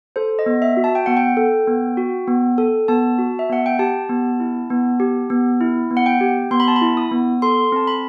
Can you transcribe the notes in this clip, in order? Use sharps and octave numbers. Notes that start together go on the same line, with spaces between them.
A4 C5
D#5
B3
E5
F#4
A5
G5
B3 F#5
G5
A4
B3
F#4
B3
A4
B3 A5
F#4
E5
B3 F#5
G5
G4 A5
B3
E4
B3
G4
B3
E4
B3
F#5
G5
G4
B3 C6
B5
A5
B5
E4
D#6
B3
A4 C6
C4 A5
B5